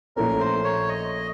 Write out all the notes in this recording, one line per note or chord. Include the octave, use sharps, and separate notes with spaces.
A#1 A#2 A3 C#4 A#4
C5
C#5
D#5